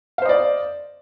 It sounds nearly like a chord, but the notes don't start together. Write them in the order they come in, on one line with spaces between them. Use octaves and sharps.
F5 C5 D#5 D5